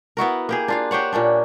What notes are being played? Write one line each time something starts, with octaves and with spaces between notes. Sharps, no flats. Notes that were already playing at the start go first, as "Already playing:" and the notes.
B3 E4 F#4 A#4
A#3 G4 G#4
D4 F4 F5
G4 C5 C#5 F#5
A#2 A#3 C#4 D4